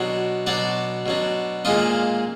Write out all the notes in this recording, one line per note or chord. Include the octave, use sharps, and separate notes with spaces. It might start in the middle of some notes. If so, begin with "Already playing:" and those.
Already playing: B2 F#3 D4
B2 F#3 D4 D5
B2 F#3 D4
A#2 G#3 D4 F4 D#5